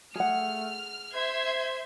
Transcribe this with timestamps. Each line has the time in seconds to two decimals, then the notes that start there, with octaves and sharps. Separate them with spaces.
0.16 A3 G#4 F#5 F6
1.14 C5 E5 C6 G#6